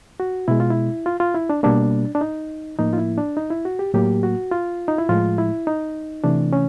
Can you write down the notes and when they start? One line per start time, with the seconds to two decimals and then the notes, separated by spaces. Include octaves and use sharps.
0.20 F#4
0.48 B2 G#3 E4
0.60 F4
0.71 E4
1.06 F4
1.20 F4
1.34 E4
1.50 D4
1.63 B2 G3 A#3 D4
2.15 D4
2.21 D#4
2.79 A2 F3 A#3 D#4
2.93 F4
2.98 E4
3.18 D4
3.37 D#4
3.50 E4
3.65 F#4
3.79 G4
3.93 A2 F#3 A#3 G4
4.23 F#4
4.51 F4
4.88 D#4
4.98 E4
5.09 A2 F3 G#3 F4
5.38 E4
5.67 D#4
6.24 C3 E3 A3 D4
6.53 C#4